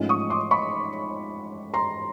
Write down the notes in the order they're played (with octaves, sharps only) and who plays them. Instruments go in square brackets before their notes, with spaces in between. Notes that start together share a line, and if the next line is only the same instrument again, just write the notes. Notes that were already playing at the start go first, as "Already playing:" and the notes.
Already playing: [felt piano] G#2 F3 A3 C#4
C#6 D#6
C6 D6
B5 C#6
A#5 C6